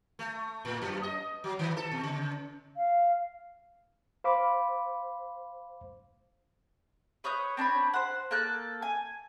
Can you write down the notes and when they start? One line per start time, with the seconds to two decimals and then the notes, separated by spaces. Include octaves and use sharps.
0.19 A3
0.65 A2
0.82 F#2
1.03 D#5
1.44 F#3
1.59 D#3
1.77 A4
1.91 B2
2.03 C#3
2.77 F5
4.24 C5 F5 B5 D6
7.24 B4 C#5 D#6 G6
7.57 C4 D4 C#5 B5
7.94 C5 F#5
8.31 A#3 A4 F#6 G6
8.82 G#5